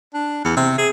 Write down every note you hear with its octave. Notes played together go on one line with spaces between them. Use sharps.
D4
E2
C3
G#4